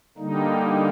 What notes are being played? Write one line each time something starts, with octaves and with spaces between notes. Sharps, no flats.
D3 G3 A#3 D#4